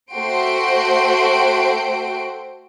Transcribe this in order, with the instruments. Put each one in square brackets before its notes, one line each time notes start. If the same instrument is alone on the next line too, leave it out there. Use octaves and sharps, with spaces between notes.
[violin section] A3 F#4 C5 G5 C6 D7